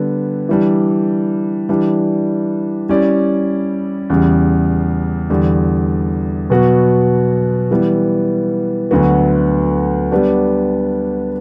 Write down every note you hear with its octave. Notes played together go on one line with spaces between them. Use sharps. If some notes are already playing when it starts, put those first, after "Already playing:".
Already playing: D3 G3 B3
E3 G3 D4
E3 G3 D4
G3 C#4 E4 G4 D5
E2 C#3 G3
E2 D3 G3
B2 F#3 B3 F#4
E3 G3 B3
D2 D3 F#3 B3 F#4
G3 B3 D4 G4